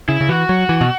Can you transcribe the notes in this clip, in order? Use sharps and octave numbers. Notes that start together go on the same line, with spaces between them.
C#3 E4
C#3
E3 F#4
F#3
E3
B2